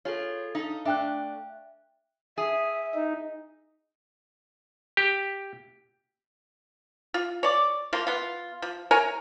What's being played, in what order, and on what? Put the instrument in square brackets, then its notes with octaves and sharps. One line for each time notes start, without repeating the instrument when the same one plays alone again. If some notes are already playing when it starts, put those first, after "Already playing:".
[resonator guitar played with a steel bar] F4 G#4 [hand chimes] A4 C#5
[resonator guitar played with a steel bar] D#4 A4 [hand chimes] F5
[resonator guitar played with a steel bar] A3 D4 [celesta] E5 G5 F#6
[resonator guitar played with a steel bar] G#4 [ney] E5
[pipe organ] D#4
[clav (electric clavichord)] G4
[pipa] F4
C#5 D5
F3 A#3 F4
B3 F4
F3
A#4 C#5 G#5 A#5